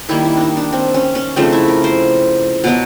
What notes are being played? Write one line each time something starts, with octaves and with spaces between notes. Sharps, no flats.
D#3 G3 A#3 E4
E4
D4 D#4
D4
C4
C#4
C#4
C#3 F3 A3 C4 D#4
E4
A#4
C5
B2 F#3 B3